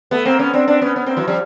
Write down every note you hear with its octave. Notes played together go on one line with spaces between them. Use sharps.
A3 B3
A#3 C4
B3 C#4
C4 D4
C4 D4
B3 C#4
B3 C#4
A#3 C4
E3 F#3
F3 G3